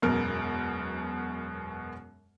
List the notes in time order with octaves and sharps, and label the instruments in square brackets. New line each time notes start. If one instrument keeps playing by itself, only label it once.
[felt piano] E1 F#2 B2 A#4